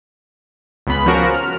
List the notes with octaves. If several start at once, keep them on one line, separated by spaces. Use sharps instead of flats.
C#2 B3 B5
F3 C#4 F#4 A#4
F6